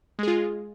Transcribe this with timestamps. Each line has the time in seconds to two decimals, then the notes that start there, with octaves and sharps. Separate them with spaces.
0.19 G#3
0.23 G#4
0.28 F4